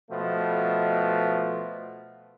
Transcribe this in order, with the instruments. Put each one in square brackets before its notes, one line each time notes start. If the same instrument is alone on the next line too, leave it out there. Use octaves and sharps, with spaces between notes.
[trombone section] B2 F3 A3